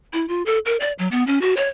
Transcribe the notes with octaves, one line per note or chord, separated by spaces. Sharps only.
E4
F4
A4
A#4
D5
F#3
B3
C#4
F#4
C#5